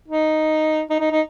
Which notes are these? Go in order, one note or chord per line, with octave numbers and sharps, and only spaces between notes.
D#4
D#4
D#4
D#4